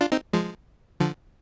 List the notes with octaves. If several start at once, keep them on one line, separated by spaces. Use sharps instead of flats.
D4 F4
C4 D#4
F3 G#3
D3 F3